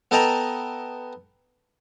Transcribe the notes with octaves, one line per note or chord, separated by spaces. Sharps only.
B3 A4 D#5 G5 A5 A#5